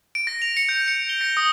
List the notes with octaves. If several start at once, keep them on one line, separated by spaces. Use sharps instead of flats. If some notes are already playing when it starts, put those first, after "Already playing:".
D7
A#6
F7
C#7
G6
C#7
G7
A#6
D#6